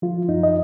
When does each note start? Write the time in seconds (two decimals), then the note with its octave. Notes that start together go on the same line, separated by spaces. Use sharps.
0.02 F3 F4
0.29 F#2 D#4
0.43 D#5